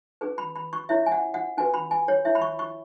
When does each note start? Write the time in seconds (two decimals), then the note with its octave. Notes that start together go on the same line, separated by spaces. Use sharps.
0.21 C#4 G#4 B4
0.38 B5
0.56 B5
0.73 C#6
0.89 C#4 E4 C#5 E5
1.06 G#5
1.12 F#5
1.34 F#5
1.57 C#4 F#4 B4 G#5
1.74 B5
1.91 G#5
2.08 C#5
2.25 E4 C#5 E5
2.35 B5
2.42 C#6
2.59 C#6